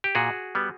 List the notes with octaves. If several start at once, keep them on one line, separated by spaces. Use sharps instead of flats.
G4
A#2 F#4 G#4
G3 B3